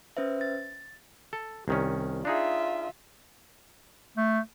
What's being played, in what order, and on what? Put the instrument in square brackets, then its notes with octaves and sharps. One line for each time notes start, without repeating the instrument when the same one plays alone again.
[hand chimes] C#4 B4 C5 E5
A6
[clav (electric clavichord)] A4
C2 D#3 C#4
[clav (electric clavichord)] D4 D#4 G#4 [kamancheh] F4 E5
[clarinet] A3